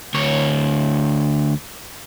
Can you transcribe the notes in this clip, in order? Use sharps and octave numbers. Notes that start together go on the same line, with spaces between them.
D2 C#5